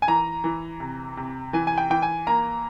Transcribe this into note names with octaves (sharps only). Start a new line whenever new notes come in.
G#5
E3 A#5
E3
C3
C3
E3 G#5
G#5
G5
E3 G5
G#5
A#3 A#5